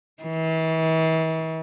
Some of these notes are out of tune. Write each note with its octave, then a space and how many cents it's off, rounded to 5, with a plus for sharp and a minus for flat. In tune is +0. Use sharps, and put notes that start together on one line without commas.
E3 -40